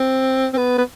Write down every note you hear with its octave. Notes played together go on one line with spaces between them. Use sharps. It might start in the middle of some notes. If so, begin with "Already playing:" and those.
Already playing: C4
C4
B3
B3